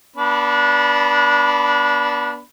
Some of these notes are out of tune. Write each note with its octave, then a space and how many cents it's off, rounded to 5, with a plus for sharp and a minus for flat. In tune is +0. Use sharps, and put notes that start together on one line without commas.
B3 -35 D4 -15 B5 +0